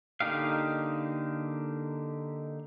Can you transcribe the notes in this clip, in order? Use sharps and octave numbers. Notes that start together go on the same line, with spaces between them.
D3 A#3 D#4 G4 F5